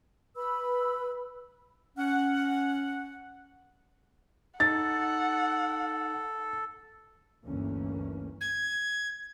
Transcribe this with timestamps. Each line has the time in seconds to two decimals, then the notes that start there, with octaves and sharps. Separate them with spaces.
0.36 B4 B5 E6
1.97 C#4 F#5
4.60 D#4 A4 F#5 A6
7.45 G1 D2 E3 A3 A#3 C#4
8.41 G#6